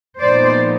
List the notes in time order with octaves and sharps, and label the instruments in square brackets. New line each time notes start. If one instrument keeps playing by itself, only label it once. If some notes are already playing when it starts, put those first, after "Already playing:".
[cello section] A#2 F3 G#3 B3 D#4 C5 D5